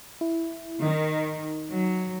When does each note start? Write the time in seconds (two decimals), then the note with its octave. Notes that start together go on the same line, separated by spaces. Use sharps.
0.21 E4
0.82 D#3 D#4
1.70 F#3